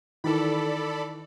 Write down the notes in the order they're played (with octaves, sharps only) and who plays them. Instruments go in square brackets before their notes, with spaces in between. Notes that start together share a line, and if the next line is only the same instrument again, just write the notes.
[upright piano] D#3 E3 [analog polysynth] A4 D5 B5